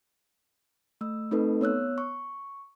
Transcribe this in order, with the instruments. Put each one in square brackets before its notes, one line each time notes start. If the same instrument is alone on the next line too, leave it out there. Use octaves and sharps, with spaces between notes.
[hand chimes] A3 E6
A3 C4 D#4 A4 B4
B3 C#5 E6 F#6
C#6